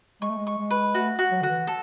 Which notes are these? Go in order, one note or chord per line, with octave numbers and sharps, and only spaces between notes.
G#3 C#6
A3
G#3
C#6
G#3
B4
A3 F#4
F#4
F#3
D3 F#4
E3
A4